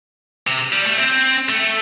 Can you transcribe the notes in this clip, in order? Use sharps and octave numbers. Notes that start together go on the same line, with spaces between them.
C3
G3
A3
C4
A3